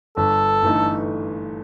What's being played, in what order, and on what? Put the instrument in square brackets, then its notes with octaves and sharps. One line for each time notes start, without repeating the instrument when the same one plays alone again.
[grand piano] G1 [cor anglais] A4
[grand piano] G2 E3 A3 D#4